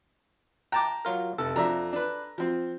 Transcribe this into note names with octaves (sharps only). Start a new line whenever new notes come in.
G5 A5 A#5 D6
F#3 F4 A#4
F1 A4
F2 D4 E5 A#5
D4 B4
F3 C4